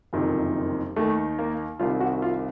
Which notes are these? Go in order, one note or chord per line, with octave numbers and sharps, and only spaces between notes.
F#1 F2 C3 D#3
D#2 D#3 A3
A#3
C2 C3 D#3 F4
F#4
F4